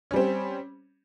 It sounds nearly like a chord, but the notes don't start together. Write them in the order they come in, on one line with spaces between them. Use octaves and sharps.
C#4 G3 C4